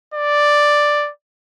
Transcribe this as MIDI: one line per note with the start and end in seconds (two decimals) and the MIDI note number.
0.14 1.10 74